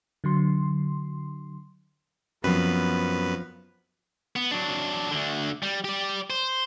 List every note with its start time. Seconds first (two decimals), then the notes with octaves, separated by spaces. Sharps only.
0.24 D3 F#3 C6
2.44 F#2 F3 B3 C4 B4
4.36 B3
4.51 F#3 D4
5.11 D2 D3
5.63 G3
5.84 G4 D5
6.30 C5